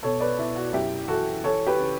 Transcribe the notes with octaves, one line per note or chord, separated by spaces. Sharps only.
B2 A4 C#5
B4 D5
B2 E4
F#4
F#2 E4 G4
E3 F#4 A4
E3 A4 C#5
G4 B4
C#3